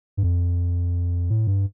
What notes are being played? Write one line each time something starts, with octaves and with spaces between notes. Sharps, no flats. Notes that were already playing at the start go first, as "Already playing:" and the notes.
G2
F2
A2
G2